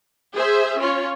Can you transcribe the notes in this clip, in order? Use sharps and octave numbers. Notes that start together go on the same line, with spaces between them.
G#4 C5 E5
C#4 F4 C#5